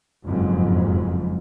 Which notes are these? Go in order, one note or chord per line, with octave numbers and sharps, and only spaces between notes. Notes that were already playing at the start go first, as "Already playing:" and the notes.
F#1 F2 G#2